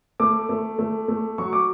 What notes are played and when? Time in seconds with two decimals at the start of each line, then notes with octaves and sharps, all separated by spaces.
0.20 A3 D6
0.49 A3
0.79 A3
1.08 A3
1.38 F#3 C#6
1.53 D6